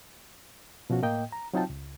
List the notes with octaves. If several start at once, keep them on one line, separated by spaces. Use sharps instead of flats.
B2 F3 C#4 F#4
A2 A#3 D#5 G5
A#5
F#3 C4 D#4 F4 G5 A5
C#2